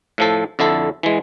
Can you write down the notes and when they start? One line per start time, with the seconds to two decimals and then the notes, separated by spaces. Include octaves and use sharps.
0.18 A2 F3 A4
0.59 F2 D3 E4 A4
1.03 E3 G#3